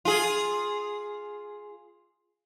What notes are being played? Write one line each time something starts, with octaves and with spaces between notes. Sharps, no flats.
F4 G#4